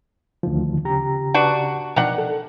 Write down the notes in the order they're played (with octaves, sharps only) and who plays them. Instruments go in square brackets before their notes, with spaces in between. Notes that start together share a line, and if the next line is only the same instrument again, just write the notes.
[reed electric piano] D2 D#3 F3
C#3 G4 A#5
[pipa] B3 D4 F#4
[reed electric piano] B2 F3 [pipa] D#3 D4 F#5
[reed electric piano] A4